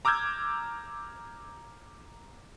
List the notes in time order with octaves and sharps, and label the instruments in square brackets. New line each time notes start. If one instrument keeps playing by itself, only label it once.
[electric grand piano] A#5 D6 E6 F6 G6 G#6